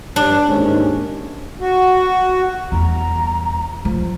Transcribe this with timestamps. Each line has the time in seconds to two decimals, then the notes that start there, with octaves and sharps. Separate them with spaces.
0.16 G2 D4
0.48 D#2 G#2 C#4
1.60 F#4
2.72 E2 G3 A#5
3.85 F3